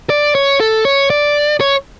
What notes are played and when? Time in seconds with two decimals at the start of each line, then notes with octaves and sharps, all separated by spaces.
0.10 D5
0.35 C#5
0.60 A4
0.85 C#5
1.10 D5
1.60 C#5